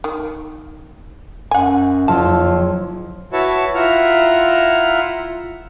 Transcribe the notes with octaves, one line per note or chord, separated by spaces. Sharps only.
D#3
F#2 F#5 G#5
F#1 F2 F4 A5
E4 F#4 B4 C#5 E5 A5
E4 F4 E5 F#5 A#5 F6